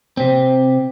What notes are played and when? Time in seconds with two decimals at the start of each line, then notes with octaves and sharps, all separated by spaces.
0.17 C3 C4